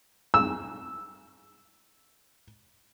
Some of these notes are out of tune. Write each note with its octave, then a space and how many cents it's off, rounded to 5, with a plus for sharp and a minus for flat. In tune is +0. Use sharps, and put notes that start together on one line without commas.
E6 -5